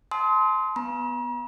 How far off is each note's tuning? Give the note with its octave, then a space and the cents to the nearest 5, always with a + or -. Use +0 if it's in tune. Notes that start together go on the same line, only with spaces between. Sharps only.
A5 -35 C6 -5 D#6 +40
B3 +0 A#5 +45